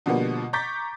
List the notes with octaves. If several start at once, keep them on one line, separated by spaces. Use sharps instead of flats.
B2 D3 F3 G3 A#3 B3
A#5 C#6 D6 G6 A6 B6